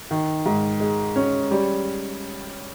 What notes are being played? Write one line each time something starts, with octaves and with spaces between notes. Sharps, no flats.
D#3
G#2
G#3
C#4
G3